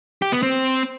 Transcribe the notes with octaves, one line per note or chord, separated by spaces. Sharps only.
G4
B3
C4